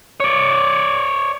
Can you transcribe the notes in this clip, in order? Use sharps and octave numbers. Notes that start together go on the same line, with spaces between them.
C#5 D5